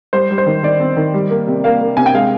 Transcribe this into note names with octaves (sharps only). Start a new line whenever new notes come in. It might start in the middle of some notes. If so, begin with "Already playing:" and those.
G3 C5
G3
C5
D#3
D#3 D5
C4
D#3
G3
A#3
C3
A#3 F5
A#3
C3 G#5
G5
G#3 F5